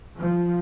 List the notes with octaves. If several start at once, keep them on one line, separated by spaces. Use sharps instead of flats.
F3